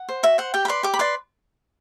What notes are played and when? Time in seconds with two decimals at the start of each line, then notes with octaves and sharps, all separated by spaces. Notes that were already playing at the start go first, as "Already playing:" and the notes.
Already playing: F#5
0.09 C5
0.23 F#4 E5
0.38 C5 F#5
0.54 G4 G5
0.65 B5
0.68 B4 D5 C6
0.83 G4 D6
0.94 B5
0.99 B4 D5 C6